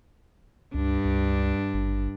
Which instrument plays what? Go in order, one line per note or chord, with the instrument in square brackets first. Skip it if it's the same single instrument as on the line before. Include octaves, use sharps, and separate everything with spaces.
[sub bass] C#2 [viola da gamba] G2 D4
[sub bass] C#2
G#1